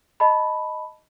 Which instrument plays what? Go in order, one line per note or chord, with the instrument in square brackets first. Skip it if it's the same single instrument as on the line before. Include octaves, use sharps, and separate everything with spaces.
[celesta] D#5 A5 B5